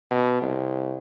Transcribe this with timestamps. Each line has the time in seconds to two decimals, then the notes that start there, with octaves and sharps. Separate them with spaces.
0.11 B2
0.42 C2